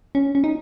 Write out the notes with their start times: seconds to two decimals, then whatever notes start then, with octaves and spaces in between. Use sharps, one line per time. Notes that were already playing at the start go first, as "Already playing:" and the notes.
0.15 C#4
0.35 C#4
0.44 D#4